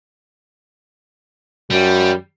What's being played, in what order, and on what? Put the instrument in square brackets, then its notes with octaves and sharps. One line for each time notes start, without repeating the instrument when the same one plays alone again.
[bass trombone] F#2 [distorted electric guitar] G3